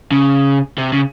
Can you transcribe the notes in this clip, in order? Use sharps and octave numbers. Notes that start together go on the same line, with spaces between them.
C#3
C3
C#3